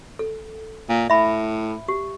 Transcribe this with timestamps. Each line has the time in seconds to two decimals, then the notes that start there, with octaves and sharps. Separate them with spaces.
0.19 A4
0.89 A#2
1.10 A2 E5 B5
1.88 G4